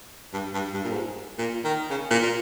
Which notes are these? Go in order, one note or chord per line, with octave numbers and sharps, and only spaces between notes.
G2
G2
G2
A#2
G#2
A#2
D#3
C#3
A#2
A#2